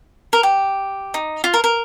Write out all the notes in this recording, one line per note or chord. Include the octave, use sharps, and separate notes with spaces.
A#4
G4
D#4
F4
A#4
A#4